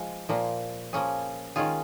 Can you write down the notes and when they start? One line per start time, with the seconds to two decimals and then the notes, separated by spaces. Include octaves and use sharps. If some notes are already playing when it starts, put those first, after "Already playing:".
Already playing: F3 G#3 F4
0.29 A#2 F3 A#3
0.93 F3 A#3 C#4 G#4
1.56 D#3 G#3 C#4 F4 G#4